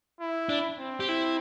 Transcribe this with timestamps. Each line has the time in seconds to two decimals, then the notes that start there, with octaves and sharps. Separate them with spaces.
0.20 E4
0.49 D4
0.79 C4
1.00 G4
1.09 E4